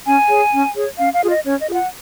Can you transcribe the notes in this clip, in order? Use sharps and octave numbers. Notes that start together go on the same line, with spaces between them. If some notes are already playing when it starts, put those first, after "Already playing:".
C#4 G#5
G#4 C#5
C#4
G#4 C#5
C#4 F5
F5
F4 G#4
D#5
C#4 C#5
D#5
F4 G#4
F#5